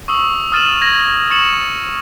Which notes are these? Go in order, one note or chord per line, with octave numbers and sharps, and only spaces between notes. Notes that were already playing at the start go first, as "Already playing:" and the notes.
C#6 D#6 E6 F#7
D#6 F6 A6 D#7 E7 F#7
G#6 A#6 F#7
C#6 A6 C#7 E7 F#7